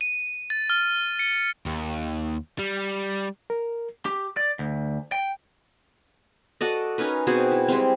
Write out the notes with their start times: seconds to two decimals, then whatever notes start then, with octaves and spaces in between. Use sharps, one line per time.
0.01 D#7
0.50 A6
0.70 F6
1.19 C#7
1.66 D#2
2.59 G3
3.50 A#4
4.06 G4
4.37 D5
4.59 D2
5.12 G5
6.61 F#4 A4 D5 D#5
6.98 C#4 D#4 A#4 B4
7.27 B2 C4 F#4 G#4
7.51 E4
7.68 G3 G#3 C4